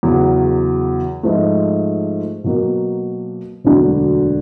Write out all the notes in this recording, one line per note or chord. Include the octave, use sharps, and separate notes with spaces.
E2 C#3 F#3
G#2 F3 A3
B2 F#3 A#3
E1 D2 D3 F#3